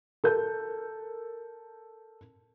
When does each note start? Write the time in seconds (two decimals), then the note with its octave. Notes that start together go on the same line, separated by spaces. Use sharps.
0.24 A4 A#4 G6